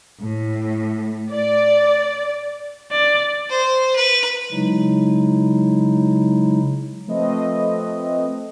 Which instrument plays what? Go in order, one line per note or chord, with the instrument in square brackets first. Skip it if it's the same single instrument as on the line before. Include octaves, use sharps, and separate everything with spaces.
[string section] A2
D5
[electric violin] D5
[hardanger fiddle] C5
B4
[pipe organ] C#3 F#3 G#3 D#4 E4
[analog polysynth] F3 A3 C4 B4 D#5